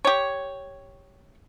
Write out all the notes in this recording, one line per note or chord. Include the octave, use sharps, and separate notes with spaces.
G4 C#5